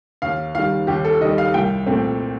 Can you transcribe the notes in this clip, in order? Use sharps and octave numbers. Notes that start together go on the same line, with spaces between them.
D#2 F5
D#3 G3 F5
D#2 G4
A4
D#3 G3 D#5
F5
C2 G5
A#2 A3 C4